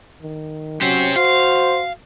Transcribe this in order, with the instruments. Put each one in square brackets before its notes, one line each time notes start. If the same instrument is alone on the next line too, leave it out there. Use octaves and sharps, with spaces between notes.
[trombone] D#3
[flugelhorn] F#3 [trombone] C#4 [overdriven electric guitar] G4 C5
[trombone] F#4 [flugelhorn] C5 [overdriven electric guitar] F5